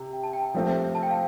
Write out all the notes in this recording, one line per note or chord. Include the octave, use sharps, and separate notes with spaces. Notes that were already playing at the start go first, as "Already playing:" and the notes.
Already playing: C3
G5
A5
G5
F3 A3 C4 G4
A5
G5
F5